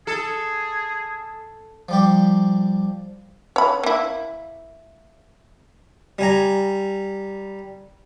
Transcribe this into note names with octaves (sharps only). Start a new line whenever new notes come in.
G#4 A4
F3 G3 G4
C#5 B5
A#3 E4
G3 G#5 A#5